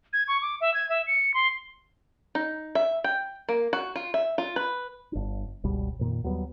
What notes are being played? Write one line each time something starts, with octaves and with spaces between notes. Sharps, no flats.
G#6
C#6
D6
E5
G#6
E5
C#7
C6
D#4
E5
G5
A#3
F#4
F4
E5
F4
B4
G1 D4
G1 C#2 B2 G3
F2 A#2 D#3
D#2 F#3 G3 B3